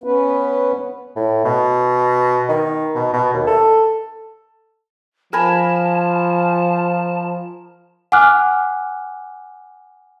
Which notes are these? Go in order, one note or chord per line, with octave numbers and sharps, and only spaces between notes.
B3 C#4 B4
A2
B2
D#3
B2
B2
D#2
A4
F3 A#4 G#5 A5 B5
F#5 G#5 D6 F6 F#6